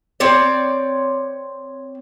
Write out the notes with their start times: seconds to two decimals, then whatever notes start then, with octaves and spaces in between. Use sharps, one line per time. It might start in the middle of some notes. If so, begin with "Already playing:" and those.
0.20 C4 C#5 D5